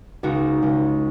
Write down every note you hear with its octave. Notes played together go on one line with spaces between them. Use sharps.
C#2 D#4 F#4
C#2